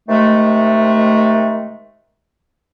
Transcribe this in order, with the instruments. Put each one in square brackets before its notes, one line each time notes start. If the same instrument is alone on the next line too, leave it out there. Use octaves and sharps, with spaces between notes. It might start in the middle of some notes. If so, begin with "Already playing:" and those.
[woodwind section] C3 D#3 G#3 A3